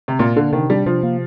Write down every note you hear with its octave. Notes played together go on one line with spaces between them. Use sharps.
C3
A#2 A#3
D3 D4
C3 D#3
G3 D4
C3 F3
A#3